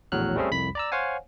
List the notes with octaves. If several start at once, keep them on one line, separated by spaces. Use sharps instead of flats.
A#1 E2 A2 F#3 F6 F#6
G3 A3 C4 C#4 G#4 A4
C2 F2 B5 B6
D5 A#5 E6
C5 C#5 F5 F#5 G#5